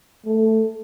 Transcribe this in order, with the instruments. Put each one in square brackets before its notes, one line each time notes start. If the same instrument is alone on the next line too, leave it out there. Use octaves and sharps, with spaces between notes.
[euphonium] A3